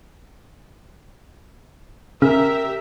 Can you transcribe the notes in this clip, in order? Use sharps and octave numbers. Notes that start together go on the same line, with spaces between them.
C#3 G4 A#4 E5